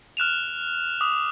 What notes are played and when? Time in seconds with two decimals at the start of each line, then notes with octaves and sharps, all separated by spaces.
0.17 F6 F#6 E7 F7
1.01 D6 D#6